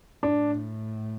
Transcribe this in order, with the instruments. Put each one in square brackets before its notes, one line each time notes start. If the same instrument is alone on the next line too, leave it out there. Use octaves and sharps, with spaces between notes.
[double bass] A2 [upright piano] D4